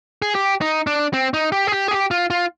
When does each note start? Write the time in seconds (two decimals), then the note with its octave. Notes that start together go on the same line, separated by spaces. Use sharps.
0.22 G#4
0.35 G4
0.61 D#4
0.87 D4
1.14 C4
1.34 D#4
1.52 G4
1.67 G#4
1.72 G4
1.88 G#4
1.91 G4
2.11 F4
2.30 F4